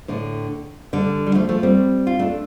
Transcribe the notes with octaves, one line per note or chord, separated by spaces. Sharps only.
A2 D3
D3 G3
G3
F3 A3
F3 A3
G3 C4
F4
A3 D4